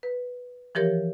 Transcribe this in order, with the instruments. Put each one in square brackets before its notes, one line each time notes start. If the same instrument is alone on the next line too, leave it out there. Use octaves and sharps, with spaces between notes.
[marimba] B4
E3 F3 G4 A#4 C#5